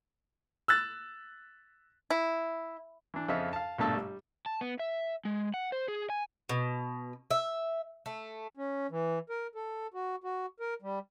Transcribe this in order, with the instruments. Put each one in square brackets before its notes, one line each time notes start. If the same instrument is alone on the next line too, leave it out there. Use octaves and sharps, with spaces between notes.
[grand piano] E6 F#6 A6
[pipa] E4
[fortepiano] E3 D4
F2 C#3 F3 D#5 E5
F5 A5
A#1 G2 B2 A3 A5 E6
G3
[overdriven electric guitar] A5
B3
E5
G#3
F#5
C5
G#4
G#5
[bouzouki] B2
E5
A3
[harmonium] C#4
E3
A#4
A4
F#4
F#4
A#4
G3